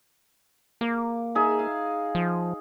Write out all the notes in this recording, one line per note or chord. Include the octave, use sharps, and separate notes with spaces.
A#3 D6
D#4 G#4 E5
F5
F3